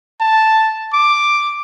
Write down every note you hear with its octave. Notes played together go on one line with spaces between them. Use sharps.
A5
D6